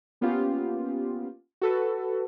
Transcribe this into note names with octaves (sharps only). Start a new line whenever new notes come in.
A#3 B3 C#4 F4 G4
F#4 A4 B4